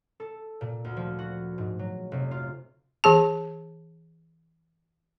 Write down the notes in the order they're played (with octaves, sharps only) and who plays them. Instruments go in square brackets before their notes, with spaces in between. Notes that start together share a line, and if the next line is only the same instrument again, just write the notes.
[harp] A4
A#2
D2
F3
F#4
G#2
F#3
F1
F4
[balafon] E3 G#4 A5